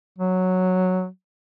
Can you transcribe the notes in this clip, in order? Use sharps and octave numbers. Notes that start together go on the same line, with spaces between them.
F#3